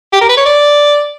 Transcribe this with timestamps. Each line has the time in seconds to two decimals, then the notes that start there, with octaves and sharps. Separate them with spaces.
0.13 G4
0.21 A#4
0.29 B4
0.37 C#5
0.45 D5